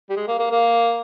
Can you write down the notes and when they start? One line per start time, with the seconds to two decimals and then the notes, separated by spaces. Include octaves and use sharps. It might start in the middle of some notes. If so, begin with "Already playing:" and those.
0.10 G3
0.16 G#3
0.28 A#3
0.39 A#3
0.52 A#3